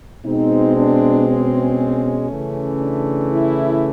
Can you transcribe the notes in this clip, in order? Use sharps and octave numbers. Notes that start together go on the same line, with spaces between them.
B2 G#3 C4 D#4
D4
C#4
C#3 E3 A3
D4
E4